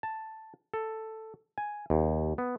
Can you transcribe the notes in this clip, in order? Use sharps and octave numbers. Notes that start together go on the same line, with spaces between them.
A5
A4
G#5
D#2
B3